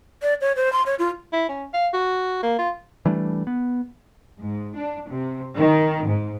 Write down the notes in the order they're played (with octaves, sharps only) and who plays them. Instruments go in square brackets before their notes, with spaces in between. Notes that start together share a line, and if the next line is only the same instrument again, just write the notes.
[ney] D5
C#5
C5
C6
C#5
F4
[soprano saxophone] E4
C#4
F5
F#4
A#3
F4
[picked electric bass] E3 G3 A3 D4
B3
[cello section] G#2
D4
C3
D#3
G#2